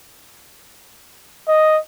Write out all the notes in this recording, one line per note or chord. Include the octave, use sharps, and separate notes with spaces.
D#5